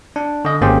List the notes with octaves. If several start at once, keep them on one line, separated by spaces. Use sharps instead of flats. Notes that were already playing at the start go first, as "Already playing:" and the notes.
D4
D3 D#5
G#1 A#3 C#4 G4 G#4 C5